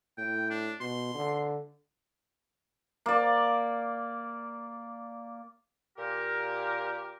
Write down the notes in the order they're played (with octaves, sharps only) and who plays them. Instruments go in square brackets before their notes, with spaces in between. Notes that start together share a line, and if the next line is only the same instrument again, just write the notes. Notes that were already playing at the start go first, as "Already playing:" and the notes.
[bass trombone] A2 [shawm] G5
[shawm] D4
[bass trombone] B2 [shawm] C6
[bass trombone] D3
[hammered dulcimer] A#3 D5
[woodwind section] A#2 G4 A#4